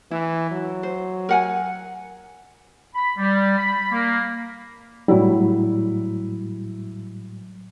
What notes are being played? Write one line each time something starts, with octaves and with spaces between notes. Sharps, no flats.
E3 E4
F#3
C5
A#4 F#5 G#5
B5
G3
B5
A#3
A2 F#3 G3 E4